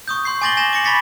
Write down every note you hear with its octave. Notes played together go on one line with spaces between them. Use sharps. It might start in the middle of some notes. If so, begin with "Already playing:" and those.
C#6 D#6 G6
C6 G6 C7
G#5 D6 A6 A#6 F#7 G7
G#5 A#6 E7
D6 A#6 C#7 F#7
B5 C#6 A6 B6 C#7